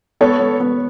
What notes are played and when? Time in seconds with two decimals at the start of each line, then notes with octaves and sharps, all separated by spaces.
0.21 B3 A4 C#5
0.39 B3
0.60 B3